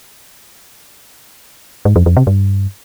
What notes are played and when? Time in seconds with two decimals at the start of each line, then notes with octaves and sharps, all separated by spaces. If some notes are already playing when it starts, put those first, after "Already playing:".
1.85 G#2
1.96 F2
2.06 F2
2.17 C3
2.27 G2